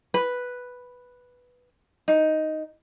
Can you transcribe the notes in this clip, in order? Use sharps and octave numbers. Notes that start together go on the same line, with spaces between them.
B4
D#4